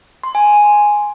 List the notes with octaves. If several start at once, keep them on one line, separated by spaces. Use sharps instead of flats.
C6
G#5
G#5